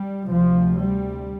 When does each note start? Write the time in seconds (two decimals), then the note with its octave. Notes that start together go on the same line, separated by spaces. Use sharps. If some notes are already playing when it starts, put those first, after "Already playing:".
Already playing: G3
0.27 D2 C3 F3
0.80 G3